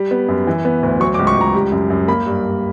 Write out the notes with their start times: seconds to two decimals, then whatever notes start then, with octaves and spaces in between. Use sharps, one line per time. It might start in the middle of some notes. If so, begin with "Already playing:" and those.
Already playing: G3
0.11 B3
0.28 F#2
0.47 E3
0.65 B3
0.83 D2
1.00 F#3 C#6
1.14 D6
1.19 C#2
1.27 C#6
1.37 C#2 A#5
1.54 G3
1.72 F#2
1.90 F#2
2.08 A#3 B5
2.26 G2
2.44 G2